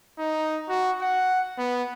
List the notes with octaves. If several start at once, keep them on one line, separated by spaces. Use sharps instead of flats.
D#4
F#4
F#5
B3